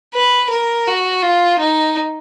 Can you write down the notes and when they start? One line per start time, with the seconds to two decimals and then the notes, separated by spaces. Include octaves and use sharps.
0.14 B4
0.50 A#4
0.87 F#4
1.22 F4
1.59 D#4